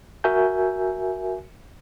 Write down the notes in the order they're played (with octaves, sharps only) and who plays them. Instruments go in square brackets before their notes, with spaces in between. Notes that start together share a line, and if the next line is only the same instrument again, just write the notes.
[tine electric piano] F#4 A#4 E5 G#5 G6